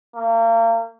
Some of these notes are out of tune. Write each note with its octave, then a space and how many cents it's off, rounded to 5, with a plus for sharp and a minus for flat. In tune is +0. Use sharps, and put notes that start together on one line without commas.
A#3 -35